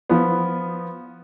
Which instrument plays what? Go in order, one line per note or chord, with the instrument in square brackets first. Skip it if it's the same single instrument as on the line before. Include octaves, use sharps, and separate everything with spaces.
[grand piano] F3 B3